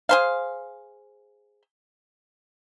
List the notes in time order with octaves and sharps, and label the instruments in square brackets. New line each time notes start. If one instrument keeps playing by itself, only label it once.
[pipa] G#4 C5 F5